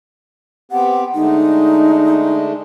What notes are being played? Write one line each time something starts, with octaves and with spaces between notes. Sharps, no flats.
B3 C4 G4 F#5
D3 G#3 A3 D#4